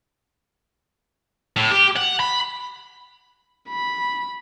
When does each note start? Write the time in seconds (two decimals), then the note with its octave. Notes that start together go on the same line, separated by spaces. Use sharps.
1.57 A2
1.71 G4
1.97 F#5
2.20 B5
3.69 B5